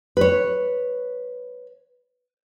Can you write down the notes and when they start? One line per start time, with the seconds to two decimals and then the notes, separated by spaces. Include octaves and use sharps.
0.17 B4 C#5